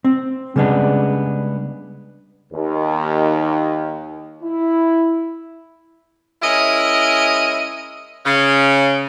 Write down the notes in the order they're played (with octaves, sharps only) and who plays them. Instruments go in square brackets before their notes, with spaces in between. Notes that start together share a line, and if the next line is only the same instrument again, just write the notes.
[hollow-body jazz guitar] C4
C#3 G3 G#3 B3 D4
[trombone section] D#2
E4
[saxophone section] G#3 C#4 E4 A#4 D#5
C#3